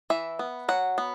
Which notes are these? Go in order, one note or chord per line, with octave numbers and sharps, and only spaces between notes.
E3 E5
B3
F#3 F#5
B3